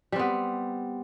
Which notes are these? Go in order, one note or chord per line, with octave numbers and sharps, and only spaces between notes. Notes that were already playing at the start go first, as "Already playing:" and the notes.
G3 B3 C4